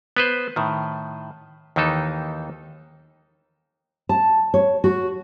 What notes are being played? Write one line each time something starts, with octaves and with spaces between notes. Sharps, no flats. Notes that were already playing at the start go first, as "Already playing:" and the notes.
B3 B4 C5
A2 D#3
D#2 D#3 E3 D#4 A4
A5
C#5
F#4